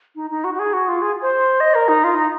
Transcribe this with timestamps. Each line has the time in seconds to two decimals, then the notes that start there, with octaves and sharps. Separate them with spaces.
0.15 D#4
0.31 D#4
0.44 F#4
0.54 F#4
0.59 G#4
0.73 F#4
0.88 F4
1.02 G#4
1.22 C5
1.60 D#5
1.75 A#4
1.88 D#4
2.04 F4
2.15 D#4